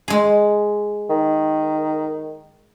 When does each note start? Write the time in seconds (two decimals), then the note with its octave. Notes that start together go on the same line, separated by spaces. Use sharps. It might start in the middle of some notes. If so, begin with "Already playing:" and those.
0.08 G#3 G#4
1.09 D#3